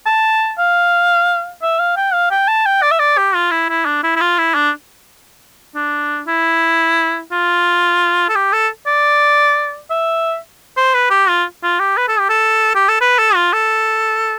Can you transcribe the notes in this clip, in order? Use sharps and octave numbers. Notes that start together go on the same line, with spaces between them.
A5
F5
E5
F5
G5
F5
G5
A5
G5
D5
E5
D5
G4
F4
E4
E4
D4
E4
E4
F4
E4
D4
D4
E4
F4
A4
G4
A4
D5
E5
C5
B4
G4
F4
F4
G4
B4
A4
G4
A4
G4
A4
B4
A4
F4
A4